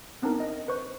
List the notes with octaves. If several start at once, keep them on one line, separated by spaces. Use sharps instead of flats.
B3 C4 D4 D#4 A#4
D#5 A#6
B4 C5 C#6 G6